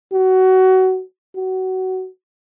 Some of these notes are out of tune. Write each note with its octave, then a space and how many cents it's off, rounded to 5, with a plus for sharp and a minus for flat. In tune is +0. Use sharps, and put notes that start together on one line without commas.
F#4 +20
F#4 +20